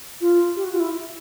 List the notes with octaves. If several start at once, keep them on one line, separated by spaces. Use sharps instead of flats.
F4
G4
F#4
F4
E4